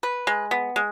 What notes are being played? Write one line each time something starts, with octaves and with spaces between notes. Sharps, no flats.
B4
G#3
B3
G#3